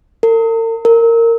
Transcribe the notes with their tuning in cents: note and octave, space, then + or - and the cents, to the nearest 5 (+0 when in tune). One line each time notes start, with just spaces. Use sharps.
A#4 -45
A#4 -20